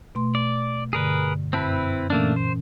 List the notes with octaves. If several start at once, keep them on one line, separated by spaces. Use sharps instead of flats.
B2 A3 C6
D5
G2 D3 G#4 A#4 B4
F#2 C4 E4 B4 A5
A#2 E3 A3 A#3 C#4 D4
C5